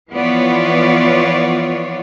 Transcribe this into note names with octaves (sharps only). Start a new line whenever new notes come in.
E3 F3 B3 F4 C#5 D5